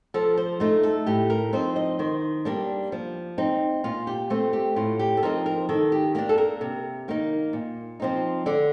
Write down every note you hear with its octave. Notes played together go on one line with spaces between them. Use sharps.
F3 A4
C5
A3 D#4 F4
A4
A2 G4
A#4
F3 C4 D#4 C5
D#5
D#3 C5
G3 A#3 D4
F3
C4 D#4
A#2 F4
G4
A3 C4 F4
G4
A2 F4
G4
A4
F3 C4 D#4 A#4
A#4
D#3 A4
G4
A#3 D4 G4
A4
A#4
C3
D#3 A#3 D#4
A#2
F3 C4 D#4
D3 D5